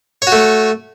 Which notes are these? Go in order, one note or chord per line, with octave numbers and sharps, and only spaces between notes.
A3 F#4 C#5